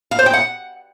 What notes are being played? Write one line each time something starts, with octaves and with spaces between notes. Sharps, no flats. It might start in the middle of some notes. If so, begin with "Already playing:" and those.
F5
C5
G5
F#5